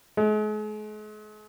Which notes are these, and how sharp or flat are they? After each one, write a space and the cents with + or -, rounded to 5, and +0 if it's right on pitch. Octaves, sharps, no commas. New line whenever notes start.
G#3 +40